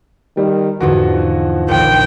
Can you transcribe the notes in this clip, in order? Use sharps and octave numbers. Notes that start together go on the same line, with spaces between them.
D#3 G3
E2 G#2 D3 F3 F#4
D#1 A#1 G5